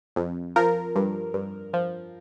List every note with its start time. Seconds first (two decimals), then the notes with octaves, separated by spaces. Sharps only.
0.16 F2
0.56 F3 A#4
0.95 G2
1.34 G2
1.73 F3